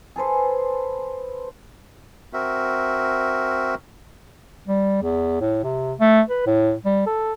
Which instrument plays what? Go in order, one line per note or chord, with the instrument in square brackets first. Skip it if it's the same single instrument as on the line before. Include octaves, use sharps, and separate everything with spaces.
[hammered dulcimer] G#4 A4 B4 C5
[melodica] C4 F#4 A#4 E5
[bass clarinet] G3
E2
A2
C3
A3
B4
A2
G3
A4